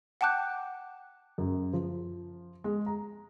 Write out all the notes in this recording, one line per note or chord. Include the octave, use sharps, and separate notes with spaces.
F#5 G5 A5 D6 F#6 G6
F#2
F3
G#3
A#5